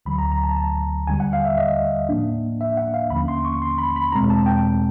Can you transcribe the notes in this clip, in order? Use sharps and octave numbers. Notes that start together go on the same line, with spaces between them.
D2 D3 F#3 B5
A#5
A#5
A5
A5
D#2 D3 G3 G#5
F#5
F5
E5
D#5
A2 F3 A#3 D4
E5
F#5
F5
D#2 D3 F3 A#3 C#4 B5
C6
C#6
C6
B5
B5
E2 B2 G#3 C4 A#5
A5
G5